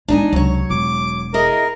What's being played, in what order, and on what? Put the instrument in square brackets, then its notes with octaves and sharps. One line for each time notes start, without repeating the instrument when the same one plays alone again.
[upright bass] G#3 B3 [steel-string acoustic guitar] D4 D#4 G#5
[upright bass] C#2 C3 [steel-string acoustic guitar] F#3 C#5
[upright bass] E1 [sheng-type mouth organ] D6
[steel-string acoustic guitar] E4 G#4 D#5 [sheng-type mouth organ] A#4